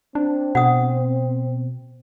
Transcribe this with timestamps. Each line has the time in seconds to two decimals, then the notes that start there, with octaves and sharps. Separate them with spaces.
0.15 C4 D4
0.55 B2 F#5 D#6